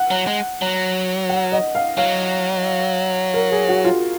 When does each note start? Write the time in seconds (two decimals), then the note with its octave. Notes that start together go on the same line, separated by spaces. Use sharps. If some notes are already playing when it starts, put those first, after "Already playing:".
Already playing: F#5
0.11 F#3
0.27 G#3
0.62 F#3
1.29 F#5
1.52 D#5
1.75 F5
1.98 F#3 F5
3.34 A#4
3.52 G#4
3.69 F#4
3.85 F4